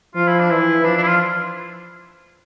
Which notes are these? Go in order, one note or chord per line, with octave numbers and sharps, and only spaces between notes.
F3 F4
E4
D4
E3 E4
F3 D4
D4
E4
F4